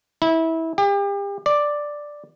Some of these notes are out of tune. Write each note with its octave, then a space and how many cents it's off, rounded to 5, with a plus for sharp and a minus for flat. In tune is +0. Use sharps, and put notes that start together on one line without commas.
E4 -20
G4 +35
D5 +5